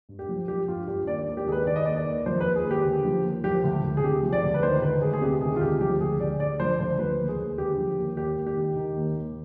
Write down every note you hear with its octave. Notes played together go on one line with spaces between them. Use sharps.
G2
G4
F3
F3 G4
G2 F4
G2 G4
D#2 D5
D#2
G4
D#3 G#4 B4
D#3 D5
D#5
D#2 D5
D5
D#2
F3 C5
B4
D#2
G#4
D#2
G4
D3
F3
D#2
F3 G4
D2
D2
G#4
C3 G4
F3
D5
D2
B4
D#3 C5
D2 B4
D2 G#4
G#4
C3 G4
D#3 G#4
F4
D2 G4
F3 G4
D2 G#4
D2 D5
D3 D5
F3 C5
D2 C5
F3 B4
D#2
G#4
D#2
D3 G4
F3
D#2
D#2 G4
D#2
G4
D#3
D#3
D#2
D#2